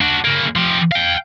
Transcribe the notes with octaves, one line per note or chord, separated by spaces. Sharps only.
D4 F#4
C#3 A#3
F3 G4
F5 G5